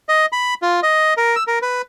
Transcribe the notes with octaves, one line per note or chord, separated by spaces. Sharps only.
D#5
B5
F4
D#5
A#4
E6
A#4
B4